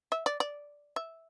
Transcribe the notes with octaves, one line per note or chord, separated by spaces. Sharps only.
E5
D5
D5
E5